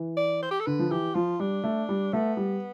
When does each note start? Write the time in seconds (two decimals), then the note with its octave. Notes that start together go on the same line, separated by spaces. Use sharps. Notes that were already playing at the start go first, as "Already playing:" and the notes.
Already playing: E3
0.17 D5
0.43 C5
0.51 G4
0.60 A4
0.66 D3 B4
0.79 F3
0.91 E3 G4
1.15 F3 F4
1.40 G3 D4
1.64 A3
1.89 G3
2.13 A3 B3
2.37 G3